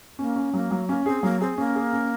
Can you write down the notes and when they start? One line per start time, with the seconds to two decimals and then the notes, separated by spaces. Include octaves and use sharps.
0.19 A#3 C#4
0.36 C#4
0.53 F#3 A#3
0.71 F#3
0.89 A#3 C#4
1.06 C4 G#4
1.23 F#3 A#3
1.41 C4 G#4
1.58 A#3 C#4
1.75 G#4
1.93 C#4